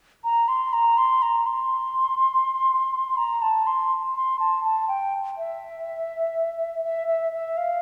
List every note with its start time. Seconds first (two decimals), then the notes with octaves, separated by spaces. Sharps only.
0.24 A#5
0.48 C6
0.73 A#5
0.98 C6
1.22 A#5
1.46 C6
3.17 A#5
3.42 A5
3.67 C6
4.16 C6
4.39 A5
4.64 A5
4.88 G5
5.37 E5
6.84 E5
7.08 E5
7.32 E5
7.57 F5